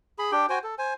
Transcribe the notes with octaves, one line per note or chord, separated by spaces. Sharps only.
G#4 B5
D4 G4 G5
F#4 C5 G5 G#5
A4
C5 G#5